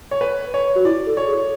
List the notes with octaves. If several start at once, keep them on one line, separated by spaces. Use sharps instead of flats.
C#5
B4
C#5
F#4
E4 D5
A4
C#5
G#4